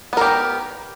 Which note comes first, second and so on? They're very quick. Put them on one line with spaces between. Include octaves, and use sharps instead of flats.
B3 A#4 G4